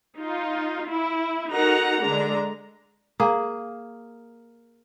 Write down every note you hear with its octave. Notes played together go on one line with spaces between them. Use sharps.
D#4 F4
E4
D#4 F#4 A4 A#4 F#5 A#5
D3 G#3 D4 A#5
A#3 G#4